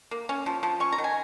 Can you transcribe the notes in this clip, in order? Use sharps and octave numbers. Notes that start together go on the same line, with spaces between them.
A#3
C#4
F3
F3
C#4 C#6
A#5
D#3
G#5